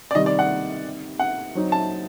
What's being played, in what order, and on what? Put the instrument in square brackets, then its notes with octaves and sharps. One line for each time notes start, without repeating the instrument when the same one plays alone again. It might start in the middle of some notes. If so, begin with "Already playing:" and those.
[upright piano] D5
[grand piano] C3 D#3 G3 [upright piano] D#5
[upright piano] D5
F#5
F#5
[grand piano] F#3 C4 D#4
[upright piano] A5